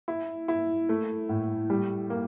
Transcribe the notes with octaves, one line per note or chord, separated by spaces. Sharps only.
E4
E4
A3
A2
G3
A#3